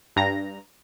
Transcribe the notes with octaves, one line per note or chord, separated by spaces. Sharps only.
G2 A#5 A#6